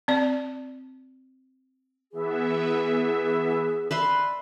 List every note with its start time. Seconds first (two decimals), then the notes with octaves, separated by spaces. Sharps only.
0.08 C4 D5
2.12 E3 B3 G#4 E5
3.91 B4 D5 E5 C6